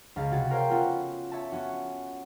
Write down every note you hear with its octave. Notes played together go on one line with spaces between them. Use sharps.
C#2 F5 A6
C3 F#4 G#6 A6
A#4 C5 C#5 F5 G5
B3 C#4 F4 F#4 A4
C#5 E5 A5
B3 C#4 F#4